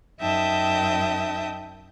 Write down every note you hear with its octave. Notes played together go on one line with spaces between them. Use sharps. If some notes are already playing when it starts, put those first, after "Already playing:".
F#2 D#4 E5 G5 A5 D#6